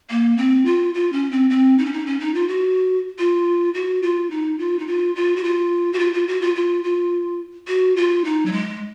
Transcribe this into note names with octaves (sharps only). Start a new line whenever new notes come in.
A#3
C4
F4
F4
C#4
C4
C4
D#4
C#4
D#4
C#4
D#4
F4
F#4
F4
F#4
F4
D#4
F4
D#4
F4
F4
F#4
F4
F#4
F4
F4
F#4
F4
F4
F4
F#4
F4
D#4
F#3
G#3